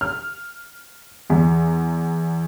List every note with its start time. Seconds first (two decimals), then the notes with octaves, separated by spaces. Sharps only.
0.01 F6
1.30 E2